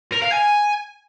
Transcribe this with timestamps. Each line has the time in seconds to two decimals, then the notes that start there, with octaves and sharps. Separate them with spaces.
0.12 A#4
0.22 F5
0.32 G#5